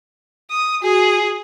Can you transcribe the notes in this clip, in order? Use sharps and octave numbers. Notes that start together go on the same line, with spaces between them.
D#6
F#4 G#4